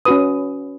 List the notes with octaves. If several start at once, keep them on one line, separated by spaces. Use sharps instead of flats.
C#4 F#4 B4 D#6